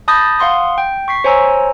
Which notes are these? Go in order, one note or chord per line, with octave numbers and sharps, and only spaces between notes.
A5 B5 D#6 G6 A6 A#6
F5 F#5 C6 D#6
G5
C#6 B6 C7
C5 C#5 G#5 A#5 E6